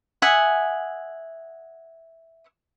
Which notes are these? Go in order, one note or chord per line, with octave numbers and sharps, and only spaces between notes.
E5 F#5 G#5 D#6